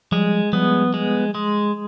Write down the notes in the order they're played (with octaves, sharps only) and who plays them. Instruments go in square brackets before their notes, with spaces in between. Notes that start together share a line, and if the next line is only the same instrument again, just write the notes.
[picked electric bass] F3 G3 [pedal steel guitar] G#3
[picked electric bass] F3 G3 [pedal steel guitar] B3
[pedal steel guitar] G#3
G#3